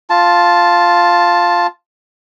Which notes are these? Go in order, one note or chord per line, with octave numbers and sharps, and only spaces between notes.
F4 A5